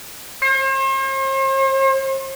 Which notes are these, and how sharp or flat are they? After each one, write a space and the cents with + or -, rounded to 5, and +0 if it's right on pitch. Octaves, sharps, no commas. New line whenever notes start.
C5 +45